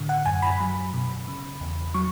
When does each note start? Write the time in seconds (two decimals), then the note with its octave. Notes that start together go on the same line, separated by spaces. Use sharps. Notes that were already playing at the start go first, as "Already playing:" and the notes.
Already playing: A2 D3
0.09 F#5
0.26 F#2 G#5
0.42 B5
0.59 F#3 B5
0.94 B2
1.28 C#3
1.61 E2
1.94 F#3 C#6